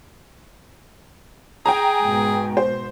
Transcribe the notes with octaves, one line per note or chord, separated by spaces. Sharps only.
G#4 G5 G#5 A#5
G#2 B2
C5